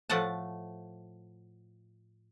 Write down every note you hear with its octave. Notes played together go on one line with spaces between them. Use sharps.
A2 F3 A3 F#5 A5